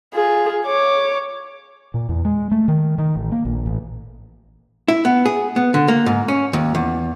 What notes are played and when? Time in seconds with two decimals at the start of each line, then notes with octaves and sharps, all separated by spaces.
0.14 F4 G#4
0.66 C#5 D6
1.94 A#2
2.09 E2
2.25 G#3
2.51 A3
2.68 D#3
2.98 D#3
3.16 A1
3.32 A#3
3.45 A#1
3.66 A1
4.88 E4
5.05 B3
5.26 G#4
5.56 B3
5.74 D3
5.88 A#3
6.06 G#2
6.28 C#4
6.53 D#2
6.75 E2